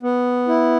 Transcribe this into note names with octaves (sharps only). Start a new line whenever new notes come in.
B3
E4